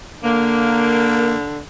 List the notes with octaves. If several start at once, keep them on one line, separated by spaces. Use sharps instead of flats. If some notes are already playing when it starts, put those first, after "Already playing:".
D3 A#3